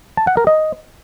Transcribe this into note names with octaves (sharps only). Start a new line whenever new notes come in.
A5
F#5
A#4
D#5